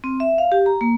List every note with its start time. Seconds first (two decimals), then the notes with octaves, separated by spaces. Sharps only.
0.04 C4
0.20 E5
0.38 F5
0.52 G4
0.66 A#5
0.81 A#3